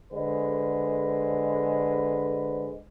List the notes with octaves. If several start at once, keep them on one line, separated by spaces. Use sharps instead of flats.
D3 G#3 B4 C5